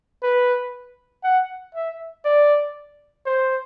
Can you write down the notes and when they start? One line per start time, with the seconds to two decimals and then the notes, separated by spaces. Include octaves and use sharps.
0.23 B4
1.24 F#5
1.75 E5
2.25 D5
3.26 C5